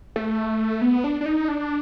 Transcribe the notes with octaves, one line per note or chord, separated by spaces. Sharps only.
A3
B3
D4
D4
D#4
D4